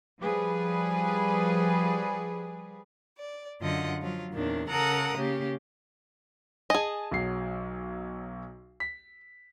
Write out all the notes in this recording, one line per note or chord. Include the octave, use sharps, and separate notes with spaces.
F3 G3 G#4 B4
D5
F#2 D3 F4 D#5 F#5
F3 F#3 F4
E2 A#2 D#3 C#4 D4
C#3 A4 A#4 F#5 A#5 D#6
C#3 A#3 C#4 G4
G#4 D#5 G#5 A5
B1 F#3 C7
B6